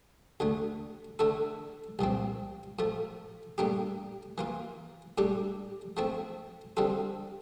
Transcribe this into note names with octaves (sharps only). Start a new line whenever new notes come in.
D2 D3 A3
D3 A3 E4 A4
C2 A#2 F3 C4
A2 F3 A3
A2 G3 A#3 D4 G4
E3 A#3 F4
A2 G3 D4 G4
F3 A3 C4 E4
D3 G3 C4 F4 A4